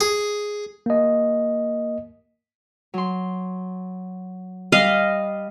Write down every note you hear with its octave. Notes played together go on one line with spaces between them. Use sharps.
G#4
A#3 D#5
F#3 C6
G3 D#5 F5 B5